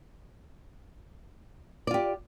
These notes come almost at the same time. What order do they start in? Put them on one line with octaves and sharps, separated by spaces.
D5 F4 G4